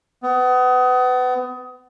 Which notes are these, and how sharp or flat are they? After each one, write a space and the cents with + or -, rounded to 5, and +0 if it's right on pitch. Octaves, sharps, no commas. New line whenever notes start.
B3 +30